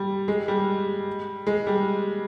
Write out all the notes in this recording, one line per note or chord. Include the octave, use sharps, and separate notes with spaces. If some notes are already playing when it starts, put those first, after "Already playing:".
Already playing: G3
G#3
G3
G#3
G3